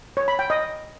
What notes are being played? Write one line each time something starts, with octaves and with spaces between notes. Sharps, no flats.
C#5
B5
G5
D#5